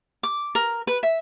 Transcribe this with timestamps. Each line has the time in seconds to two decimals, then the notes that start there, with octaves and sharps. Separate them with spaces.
0.23 D6
0.55 A#4
0.87 B4
1.03 E5